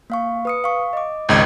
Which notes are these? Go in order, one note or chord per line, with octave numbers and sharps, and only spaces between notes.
A#3 F5 C#6
B4 D#6 C#7
F5 C#6
D#5 D6
G#1 C#2 D#5 G6 G#6